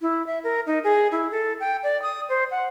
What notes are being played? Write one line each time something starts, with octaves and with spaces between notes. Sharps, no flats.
E4
E5
A#4
D#4
G#4
E4
A4
G5
D5
D#6
C5
F#5